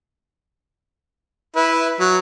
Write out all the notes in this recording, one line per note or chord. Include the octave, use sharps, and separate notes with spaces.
E4 B4
F#3